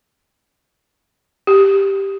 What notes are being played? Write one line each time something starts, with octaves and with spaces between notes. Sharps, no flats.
G4